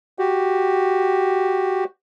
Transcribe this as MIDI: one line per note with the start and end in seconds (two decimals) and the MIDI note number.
0.19 1.84 66
0.19 1.84 67